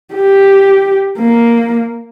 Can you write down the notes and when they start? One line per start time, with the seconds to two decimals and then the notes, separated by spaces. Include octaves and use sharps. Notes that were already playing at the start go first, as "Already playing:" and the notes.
0.14 G4
1.18 A#3